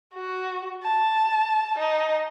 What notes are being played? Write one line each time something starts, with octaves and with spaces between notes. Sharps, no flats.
F#4
A5
D#4